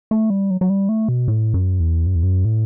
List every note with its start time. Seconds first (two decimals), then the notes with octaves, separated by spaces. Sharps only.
0.11 A3
0.30 G3
0.50 F#3
0.61 F#3
0.69 G3
0.89 A3
1.09 B2
1.28 A2
1.54 F#2
1.80 E2
2.06 F#2
2.15 E2
2.23 F#2
2.45 A2